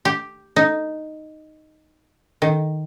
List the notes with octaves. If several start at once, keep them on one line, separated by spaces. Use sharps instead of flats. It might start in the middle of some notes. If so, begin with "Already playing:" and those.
G4
D#4
D#3